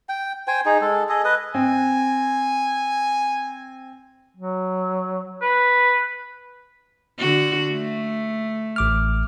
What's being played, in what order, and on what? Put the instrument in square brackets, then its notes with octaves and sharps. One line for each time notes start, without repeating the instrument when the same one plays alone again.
[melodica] G5
C5 G5 G#5
D#4 G#4
G#3 A4
G#4 A4 D#5
B4 D#5
[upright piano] C4 [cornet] G#5
[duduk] F#3
[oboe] B4
[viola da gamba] D3 F#4
A3
[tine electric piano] A1 D6 F6